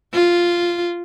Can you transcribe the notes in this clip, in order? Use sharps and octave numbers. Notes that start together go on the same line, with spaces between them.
F4